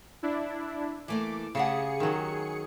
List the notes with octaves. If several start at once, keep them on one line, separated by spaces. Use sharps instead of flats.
D4 E4
E3 A3 A#3 D6
C#3 A3 G4 G#4 F#5 C#7
D#3 F#3